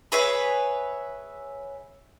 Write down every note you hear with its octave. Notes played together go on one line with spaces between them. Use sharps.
G#4 B4 C#5 E5